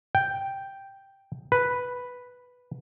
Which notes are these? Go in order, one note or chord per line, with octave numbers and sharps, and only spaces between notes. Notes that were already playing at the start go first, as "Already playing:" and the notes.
G5
B4